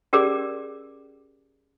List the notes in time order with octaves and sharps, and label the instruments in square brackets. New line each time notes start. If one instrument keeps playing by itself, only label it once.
[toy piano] C#4 G4 G#4 A#4 D5 D6